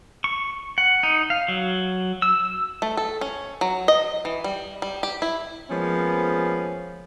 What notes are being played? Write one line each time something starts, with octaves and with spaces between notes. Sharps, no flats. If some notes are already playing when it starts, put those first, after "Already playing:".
C#6
F#5
D#4
F5
F#3
E6
A3
A4
C#4
F#3
D#5
E3
G3
G3
G4
E4
F3 G#3 A#3 B3 C#4